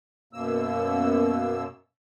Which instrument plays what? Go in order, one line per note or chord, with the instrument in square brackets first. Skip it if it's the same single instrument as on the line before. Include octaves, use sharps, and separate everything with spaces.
[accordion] F#2 B2 A#3 E6